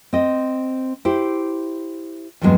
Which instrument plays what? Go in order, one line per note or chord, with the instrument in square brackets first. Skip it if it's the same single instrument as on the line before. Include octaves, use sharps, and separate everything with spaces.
[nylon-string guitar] C4 D#5
E4 G4 C5
E2 G2 F#3 G#3 B3 C4